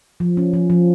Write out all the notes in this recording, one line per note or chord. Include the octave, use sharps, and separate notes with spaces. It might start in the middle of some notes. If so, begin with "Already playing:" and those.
F3
C#4
F3
F3